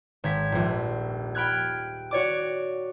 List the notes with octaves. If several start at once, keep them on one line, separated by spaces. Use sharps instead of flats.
G#1 G#6 B6
D#1 A#1
G5 B5 F6 F#6 G#6
F#4 C#5 D5 D6